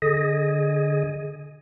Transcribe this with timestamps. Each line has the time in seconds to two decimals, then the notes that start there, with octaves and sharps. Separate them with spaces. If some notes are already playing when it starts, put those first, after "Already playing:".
0.02 D3 G#4 D#5